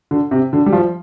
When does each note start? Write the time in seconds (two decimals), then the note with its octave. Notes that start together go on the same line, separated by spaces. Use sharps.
0.11 D3
0.31 C3
0.53 D3
0.66 G3
0.73 F3